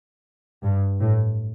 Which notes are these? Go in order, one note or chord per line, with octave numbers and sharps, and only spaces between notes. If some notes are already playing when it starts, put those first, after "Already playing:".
G2
A2